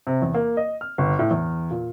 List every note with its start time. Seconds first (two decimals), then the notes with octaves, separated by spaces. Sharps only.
0.07 C3
0.22 E2
0.34 A#3
0.57 D#5
0.81 F6
0.98 G1
1.19 A2
1.31 E2
1.70 A#2